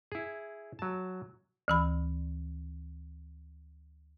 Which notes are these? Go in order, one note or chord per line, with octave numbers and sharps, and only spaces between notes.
E4 G#4
F#3 A5
D2 E3 B5